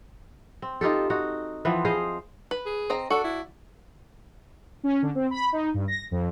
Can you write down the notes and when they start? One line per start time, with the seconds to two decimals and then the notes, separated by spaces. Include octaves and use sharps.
0.62 C4
0.81 D#4 F4 G4 A4
1.10 D#4 F#4
1.65 E3 F3 B3 C4
1.85 G#4 C5 D#5 F5
2.51 B4
2.66 G#4
2.90 C4 D#5 A#5
3.10 D4 F#4 A4
3.24 E4
4.84 C#4
5.02 D3
5.15 C4
5.31 B5
5.52 D#4
5.74 G2
5.88 A#6
6.11 F2